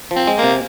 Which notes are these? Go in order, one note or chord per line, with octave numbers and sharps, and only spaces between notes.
F3
C4
G#3
A#3
C3